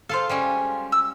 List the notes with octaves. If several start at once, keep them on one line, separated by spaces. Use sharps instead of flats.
F4 A4 C5 F5
G3 G#3 C#4
E6